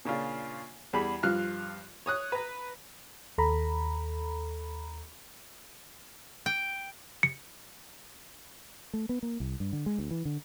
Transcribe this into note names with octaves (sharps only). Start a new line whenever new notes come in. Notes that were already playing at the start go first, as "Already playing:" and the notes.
A#2 C#3 D4 F4
E2 G3 G#4 B5
G2 F3 F4 F6 F#6
C#5 D#6 F#6
B4 A#5
D#2 A4 A#5 B5
G5
C#7
A3
B3
A#3
C2
G2
D3
G#3
D2
E3
D3